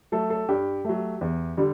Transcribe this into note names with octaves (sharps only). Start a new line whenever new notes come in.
F#3 A3 A4
A4
G2 G4
F#3 A3
E2
D3 G3